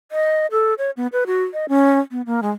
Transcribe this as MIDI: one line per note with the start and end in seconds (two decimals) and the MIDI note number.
0.12 0.46 75
0.51 0.74 69
0.78 0.91 73
0.97 1.07 59
1.13 1.24 71
1.27 1.44 66
1.53 1.66 75
1.69 1.99 61
2.11 2.22 59
2.26 2.40 58
2.43 2.51 56